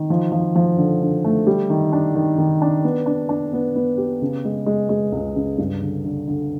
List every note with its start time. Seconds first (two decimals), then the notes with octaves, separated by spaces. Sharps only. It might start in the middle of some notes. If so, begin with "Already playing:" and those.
Already playing: D#3
0.10 F3
0.32 F3
0.56 F3
0.78 D3
1.02 D3
1.25 A3
1.47 G3
1.70 D#3
1.93 D4
2.15 D#3
2.38 D#3
2.62 D4
2.84 B3
3.06 D4
3.29 D4
3.53 B3
3.76 B3
3.98 G4
4.22 C#3
4.45 G#3
4.66 G#3
4.89 G#3
5.12 C#2
5.36 C#3
5.58 G2
5.82 D3
6.05 D3
6.28 D3